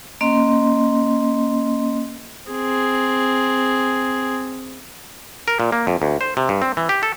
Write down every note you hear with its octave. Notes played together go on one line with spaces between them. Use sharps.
A#3 C#4 D#5 C6
C4 G#4
A#4
A#2
A#3
F2
D2
C5
C3
G2
C4
E3
G4
A4